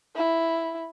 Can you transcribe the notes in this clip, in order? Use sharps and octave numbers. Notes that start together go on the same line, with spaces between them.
E4